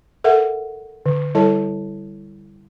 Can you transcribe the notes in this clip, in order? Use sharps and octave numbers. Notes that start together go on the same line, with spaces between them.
A4 A#4 E5 F#5
D3
G3 E4 A4 C#5 A5